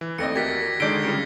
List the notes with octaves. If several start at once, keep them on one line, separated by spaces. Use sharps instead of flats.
E3
D#2 A3 C4 D5 D#5 A#6 C#7
F#4 G4 A#4 G#6 A6 B6
D3 D#3 G#3 D5 G6 C7 D7 G7
C#3 G3 F4 G#6 C#7